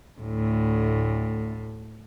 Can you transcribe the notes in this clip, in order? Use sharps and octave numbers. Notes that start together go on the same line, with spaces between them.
D2 A2